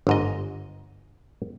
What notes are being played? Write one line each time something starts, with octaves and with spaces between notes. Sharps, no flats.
G1 G#2 D#5